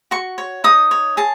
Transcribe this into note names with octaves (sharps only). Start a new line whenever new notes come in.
F#4 C#6
C#5
D#4 D#6
C#5
G#4 A5